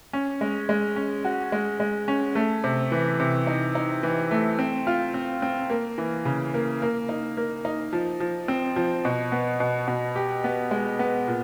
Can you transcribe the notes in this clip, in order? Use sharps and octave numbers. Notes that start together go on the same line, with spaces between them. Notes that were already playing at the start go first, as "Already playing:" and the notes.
C#4
G#3
G#3
C#4
F#4
G#3
G#3
C#4
A3
C3
E3
C3
D#4
D#4
E3
A3
C4
F4
C4
C4
A#3
E3
C#3
A#3
A#3
D#4
A#3
D#4
F3
F3
C4
F3
B2
B3
B2
B2
G4
B3
G#3
B3
A#2